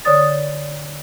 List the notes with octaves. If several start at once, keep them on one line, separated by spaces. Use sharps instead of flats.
D3 C#5 D5 D#6 A6